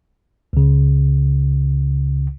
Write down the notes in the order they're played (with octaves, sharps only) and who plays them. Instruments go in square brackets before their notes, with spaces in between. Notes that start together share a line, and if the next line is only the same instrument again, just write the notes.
[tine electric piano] C#2 C#3